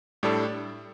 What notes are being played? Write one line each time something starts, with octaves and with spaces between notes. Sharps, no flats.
A2 G3 D4 A4